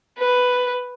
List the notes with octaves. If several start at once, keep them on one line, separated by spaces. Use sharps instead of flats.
B4